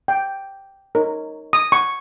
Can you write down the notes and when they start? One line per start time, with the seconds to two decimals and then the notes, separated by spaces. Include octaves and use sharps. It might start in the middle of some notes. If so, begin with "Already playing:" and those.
0.08 G5
0.95 D#4 A#4 C#5
1.53 D#6
1.72 C#6